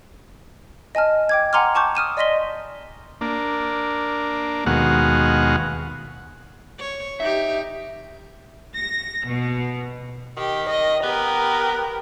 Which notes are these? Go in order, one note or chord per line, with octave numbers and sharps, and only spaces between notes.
D#5 G#5 A5 F6
G5 D6 G#6
F#5 G#5 A#5 C6 D6 F6
G#5 A5 C#6 D6 G6
D#6 F6 D#7 E7
D5 D#5 C6 A#6 B6 G7
A#3 D4
D#2 B2 G#3 F#4 F5 F#5
C#5
D#4 G4 E5
A#6
B2
D#3 G4
D#5
B3 G4 A#4